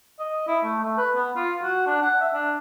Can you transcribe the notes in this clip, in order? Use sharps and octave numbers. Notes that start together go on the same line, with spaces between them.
D#5
E4
A3
A3
B4
B3
F4
F#4
D4
F#5
E5
D4